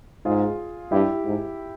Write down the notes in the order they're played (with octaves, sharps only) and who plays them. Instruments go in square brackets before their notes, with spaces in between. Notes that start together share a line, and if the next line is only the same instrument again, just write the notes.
[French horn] G#2 [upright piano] F4 G#4
[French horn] G2 [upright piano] E4 G4
[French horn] G#2